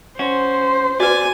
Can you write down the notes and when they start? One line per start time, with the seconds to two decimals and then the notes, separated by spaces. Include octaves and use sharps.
0.19 C#4 F#4 C5
1.00 F#4 B4 D5 G#5